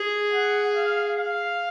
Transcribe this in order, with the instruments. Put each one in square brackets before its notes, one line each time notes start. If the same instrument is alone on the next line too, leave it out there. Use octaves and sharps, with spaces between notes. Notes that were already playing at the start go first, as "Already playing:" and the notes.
Already playing: [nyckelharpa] G#4
[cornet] F#5
F5
F5